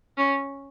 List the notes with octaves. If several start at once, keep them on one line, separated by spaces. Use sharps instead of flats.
C#4